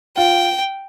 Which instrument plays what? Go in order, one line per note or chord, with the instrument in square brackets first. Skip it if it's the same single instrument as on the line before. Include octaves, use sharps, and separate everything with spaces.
[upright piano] F4 [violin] G5